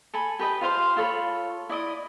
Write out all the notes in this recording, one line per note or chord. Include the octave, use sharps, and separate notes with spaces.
A4 G#5 B5
G4 B4 D#5 G5
F4 C5 F5 C6
F4 A4 C#5 B5
E4 D5 D#5 D#6